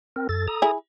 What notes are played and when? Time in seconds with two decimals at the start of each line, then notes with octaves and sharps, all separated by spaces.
0.16 C4 A#4
0.29 F#2 A4 A6
0.48 A4 A#5 D#6
0.62 E4 G#4